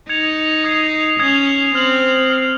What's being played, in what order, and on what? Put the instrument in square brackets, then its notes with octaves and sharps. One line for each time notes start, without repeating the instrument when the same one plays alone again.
[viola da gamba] D#4 [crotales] G#6 C#7 F7
[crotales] D#6 G#6 C7 F7
[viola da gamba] C#4 [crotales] D#6 G#6 C7 F7
[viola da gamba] C4 [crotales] F6 C7 F#7
[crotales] F6 C7 F#7